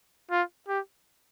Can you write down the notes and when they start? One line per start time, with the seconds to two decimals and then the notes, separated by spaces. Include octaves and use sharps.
0.31 F4
0.68 G4